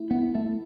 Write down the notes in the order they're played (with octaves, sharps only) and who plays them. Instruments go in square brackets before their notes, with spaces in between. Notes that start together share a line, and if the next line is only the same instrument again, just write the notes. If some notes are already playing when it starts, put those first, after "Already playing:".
Already playing: [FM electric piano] A3 E4
[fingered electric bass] B3 [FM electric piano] E4
[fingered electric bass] A3 [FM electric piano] E4